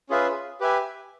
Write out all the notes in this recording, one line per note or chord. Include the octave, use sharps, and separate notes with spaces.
C#4 F4 G#4 B4 E5
G4 B4 E5 G#5